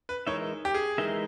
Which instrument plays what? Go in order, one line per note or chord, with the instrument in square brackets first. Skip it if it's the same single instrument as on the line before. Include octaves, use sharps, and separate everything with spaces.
[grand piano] B4
[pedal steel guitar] E3 G#3 D#4 A#4 E5 [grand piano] C#5
[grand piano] G4
G#4
[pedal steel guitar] E3 G#3 D#4 A#4 E5